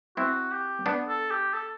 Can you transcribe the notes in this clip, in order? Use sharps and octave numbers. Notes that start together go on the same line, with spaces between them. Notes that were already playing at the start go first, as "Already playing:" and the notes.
C4 E4 F#4
G4
B3 D4
A4
G4
A4